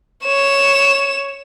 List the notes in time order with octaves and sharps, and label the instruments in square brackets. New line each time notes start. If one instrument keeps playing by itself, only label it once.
[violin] C#5 E7